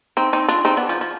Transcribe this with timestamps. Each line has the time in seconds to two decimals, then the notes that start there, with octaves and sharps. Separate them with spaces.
0.17 C4 D#4
0.33 C4 D#4
0.48 D4 F4
0.65 C4 D#4
0.77 B3 D4
0.89 F3
1.01 F3